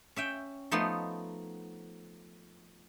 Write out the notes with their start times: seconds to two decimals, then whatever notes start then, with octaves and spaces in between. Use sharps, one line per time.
0.16 C#4 E5 G5
0.71 F3 A3 B3 D#4 C6